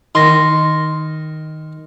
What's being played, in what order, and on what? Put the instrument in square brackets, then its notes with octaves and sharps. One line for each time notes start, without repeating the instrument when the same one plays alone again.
[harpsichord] D#3 [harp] C6 A#6